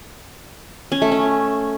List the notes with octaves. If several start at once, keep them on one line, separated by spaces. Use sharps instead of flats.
C#4
A3
C#4